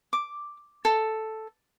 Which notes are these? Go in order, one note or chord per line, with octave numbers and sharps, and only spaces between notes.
D6
A4